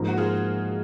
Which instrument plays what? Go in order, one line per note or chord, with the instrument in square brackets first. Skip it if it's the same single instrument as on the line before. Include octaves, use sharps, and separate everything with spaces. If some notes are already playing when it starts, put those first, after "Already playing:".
Already playing: [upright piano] G#2 F3 A#3
[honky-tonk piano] F#4
F4 G#4